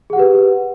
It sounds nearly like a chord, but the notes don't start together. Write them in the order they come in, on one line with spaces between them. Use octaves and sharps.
G#4 F#5 G4 B4